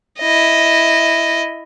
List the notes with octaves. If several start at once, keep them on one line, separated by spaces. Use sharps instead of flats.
E4 D#5